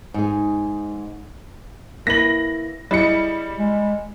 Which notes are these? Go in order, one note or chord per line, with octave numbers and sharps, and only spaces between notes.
G#2 G#4
A#3 E4 B4 A#6 F#7
G3 E4 G#4 D#5 C#7
G#3